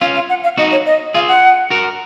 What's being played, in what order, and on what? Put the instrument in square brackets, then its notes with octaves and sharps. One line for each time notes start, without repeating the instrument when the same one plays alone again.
[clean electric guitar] C#4 F4 [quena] F5
[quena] F5
F#5
F5
[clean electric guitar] D#4 F#4 [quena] D#5
[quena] C#5
D#5
[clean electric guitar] F4 G#4 [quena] F5
[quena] F#5
[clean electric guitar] F#4 A#4